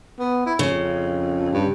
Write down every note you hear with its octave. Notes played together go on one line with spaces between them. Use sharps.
B3
E4
F2 C#3
G2